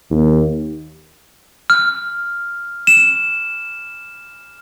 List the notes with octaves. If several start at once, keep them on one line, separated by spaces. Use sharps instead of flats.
D#2
F6
E7